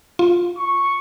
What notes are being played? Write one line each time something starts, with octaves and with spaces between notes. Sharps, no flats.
F4
C#6